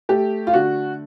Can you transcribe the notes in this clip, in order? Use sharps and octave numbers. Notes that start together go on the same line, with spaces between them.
A3 G4
F4
D3 F#4